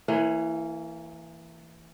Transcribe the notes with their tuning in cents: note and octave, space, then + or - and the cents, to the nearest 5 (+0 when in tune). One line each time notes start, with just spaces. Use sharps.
E3 +5 A#3 -30 C#5 +10